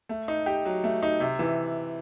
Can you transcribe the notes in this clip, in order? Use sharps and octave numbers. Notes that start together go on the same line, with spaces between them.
A3
D#4
G4
F#3
A3
D#4
C3
E3